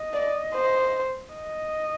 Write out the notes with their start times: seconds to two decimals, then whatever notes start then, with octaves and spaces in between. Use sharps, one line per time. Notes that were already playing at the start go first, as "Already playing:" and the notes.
Already playing: D#5
0.14 D5
0.54 C5
1.34 D#5